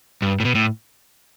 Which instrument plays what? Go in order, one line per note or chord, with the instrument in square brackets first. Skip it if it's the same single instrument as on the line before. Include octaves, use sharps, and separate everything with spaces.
[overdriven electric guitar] G2
A2
B2
A2